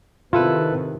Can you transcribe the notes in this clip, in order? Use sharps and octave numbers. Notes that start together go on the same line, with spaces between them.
C3 D#3 E4 F4 A4 B4